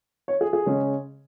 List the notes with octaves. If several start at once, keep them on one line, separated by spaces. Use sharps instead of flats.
C#5
G#4
G#4
C#3 G#3 C#4